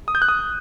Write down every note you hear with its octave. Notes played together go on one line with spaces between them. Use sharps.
D#6
G6
F#6
D#6